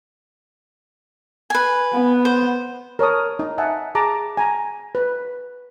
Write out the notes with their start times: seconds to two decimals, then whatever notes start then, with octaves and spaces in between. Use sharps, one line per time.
1.50 B4 G#5
1.93 B3
2.25 C5
2.99 A#4 C#5 A5 D#6
3.39 D#4
3.58 D#5 E5 F#5 G#5 A5
3.95 G#4 A5 A#5 D6
4.37 G#5 A#5
4.95 B4